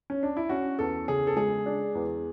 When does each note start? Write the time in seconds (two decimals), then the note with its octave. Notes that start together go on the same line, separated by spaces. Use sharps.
0.10 C#4
0.23 D4
0.37 E4
0.49 C#4 F#4
0.79 E2 A4
1.08 C#3 G#4
1.27 A4
1.37 G#3 G#4
1.66 D4
1.95 E2